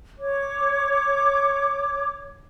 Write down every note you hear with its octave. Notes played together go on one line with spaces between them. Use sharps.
C#5 D6